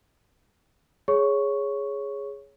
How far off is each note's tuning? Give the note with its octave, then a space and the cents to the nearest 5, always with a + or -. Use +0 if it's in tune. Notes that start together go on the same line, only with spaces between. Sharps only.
G#4 +0 C#5 +0 C#6 +0